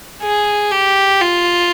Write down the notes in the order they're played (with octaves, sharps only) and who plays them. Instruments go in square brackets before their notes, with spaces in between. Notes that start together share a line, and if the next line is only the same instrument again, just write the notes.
[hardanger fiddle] G#4
G4
F4